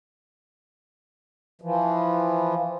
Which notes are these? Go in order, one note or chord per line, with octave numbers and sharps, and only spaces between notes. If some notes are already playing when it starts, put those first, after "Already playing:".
E3 F3